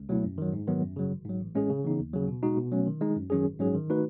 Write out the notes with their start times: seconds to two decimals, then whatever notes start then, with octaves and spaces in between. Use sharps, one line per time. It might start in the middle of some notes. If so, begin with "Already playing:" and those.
Already playing: C#2
0.09 B2 F#3 A3 E4
0.24 F#2
0.38 D#3 F#3
0.53 G#2
0.67 D#3 F#3 B3
0.82 F#2
0.96 C#3 F#3
1.11 G#1
1.25 G#2 F#3
1.40 A1
1.55 A2 G#3 C#4 G#4
1.70 C#3
1.84 E3 B3 D#4
1.99 D#2
2.14 C#3 F#3
2.28 B2
2.43 G#3 D#4 F#4
2.57 B2
2.72 F#3 A3 C#4
2.86 D#3
3.01 G#3 D#4
3.16 F#2
3.30 D#3 F#3 C#4 G#4
3.46 G#1
3.59 G#2 F#3 C#4 G#4
3.75 D#3
3.90 A3 D#4 F#4 B4